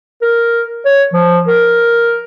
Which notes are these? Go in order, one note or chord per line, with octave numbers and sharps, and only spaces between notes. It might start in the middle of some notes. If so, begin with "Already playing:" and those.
A#4
C#5
F3
A#4